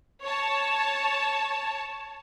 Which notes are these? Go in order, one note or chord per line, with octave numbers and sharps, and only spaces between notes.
C#5 A5